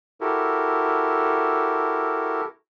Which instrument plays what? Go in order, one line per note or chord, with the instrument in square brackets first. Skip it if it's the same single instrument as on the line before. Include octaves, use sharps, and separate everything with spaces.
[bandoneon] E4 F#4 G4 A4 A#4